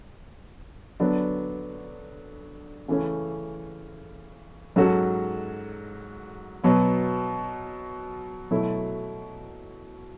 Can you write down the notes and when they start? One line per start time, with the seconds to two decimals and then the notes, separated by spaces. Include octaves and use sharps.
1.00 D3 F#3 B3 D4
2.88 C#3 E3 A3 C#4
4.76 G#2 F#3 C#4 F#4 A4
6.64 B2 F#3 B3
8.51 B2 F#3 A3 E4